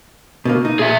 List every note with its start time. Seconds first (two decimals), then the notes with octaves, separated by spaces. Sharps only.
0.45 B2 D3 A#3
0.65 D#4
0.79 A#2 G#4 E5